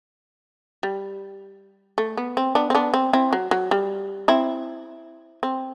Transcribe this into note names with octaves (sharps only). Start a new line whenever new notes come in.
G3
A3
B3
C4
B3 D4
C4
B3 D4
C4
C4 E4
F#3
F#3
G3
C4 E4
C4